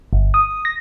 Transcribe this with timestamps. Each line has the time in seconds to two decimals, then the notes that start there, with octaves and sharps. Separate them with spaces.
0.13 G1
0.34 D#6
0.65 A#6